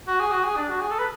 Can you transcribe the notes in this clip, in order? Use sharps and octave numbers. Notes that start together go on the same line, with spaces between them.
F#4
G#4
F#4
G#4
D4
F#4
G#4
A4
B4